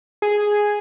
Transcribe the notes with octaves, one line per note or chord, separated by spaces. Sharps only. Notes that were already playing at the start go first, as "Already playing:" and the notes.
G#4